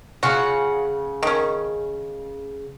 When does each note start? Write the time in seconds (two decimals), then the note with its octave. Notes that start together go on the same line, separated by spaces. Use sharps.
0.23 C#3 F4 F#4 F#5
1.23 D#3 C#4